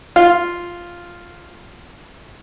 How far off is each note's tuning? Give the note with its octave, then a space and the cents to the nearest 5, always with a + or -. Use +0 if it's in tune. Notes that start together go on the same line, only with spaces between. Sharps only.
F4 +0